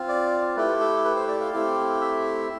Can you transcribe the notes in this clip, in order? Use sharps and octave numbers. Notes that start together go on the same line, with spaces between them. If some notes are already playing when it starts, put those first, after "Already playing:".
Already playing: C4 F4
D5
A3 E4 G4 B4
A4
B4
C5
D5
F5
A3 C4 E4 G4
E5